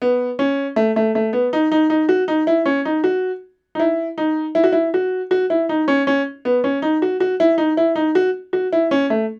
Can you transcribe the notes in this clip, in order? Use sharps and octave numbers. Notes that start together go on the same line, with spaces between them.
B3
C#4
A3
A3
A3
B3
D#4
D#4
D#4
F#4
D#4
E4
C#4
D#4
F#4
D#4
E4
D#4
E4
F#4
E4
F#4
F#4
E4
D#4
C#4
C#4
B3
C#4
D#4
F#4
F#4
E4
D#4
E4
D#4
F#4
F#4
E4
C#4
A3